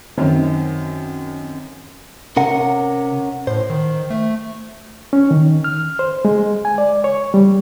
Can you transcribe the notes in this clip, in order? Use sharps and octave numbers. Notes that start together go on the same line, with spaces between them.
F#2 D#3 C4
C3 C#4 A#4 F#5
A2 C5
D#3
A3
C#4
D#3
F6
C5
G#3
G#5
D5
C#5
G3